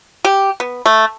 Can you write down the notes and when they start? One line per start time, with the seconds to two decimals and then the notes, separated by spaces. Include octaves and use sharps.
0.24 G4
0.60 B3
0.86 A3